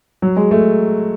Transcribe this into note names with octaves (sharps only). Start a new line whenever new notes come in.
F#3
G#3
A3